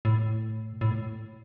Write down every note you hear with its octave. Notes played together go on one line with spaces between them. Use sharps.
A2
A2